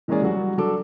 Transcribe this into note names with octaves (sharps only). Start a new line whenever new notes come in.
E3 G#3 A#3 C#4 G#4 D5
F#3 G3 F#4
F#3 D4 A4 D6